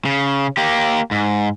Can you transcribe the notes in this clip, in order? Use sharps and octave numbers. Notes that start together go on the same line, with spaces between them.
C#3
A#3 G4
G#2